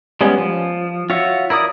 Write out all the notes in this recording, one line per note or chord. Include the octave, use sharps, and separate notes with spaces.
G3 G#3 B3 C#4
F3
F4 F#4 C#5 E5
E4 A#4 D5 D#6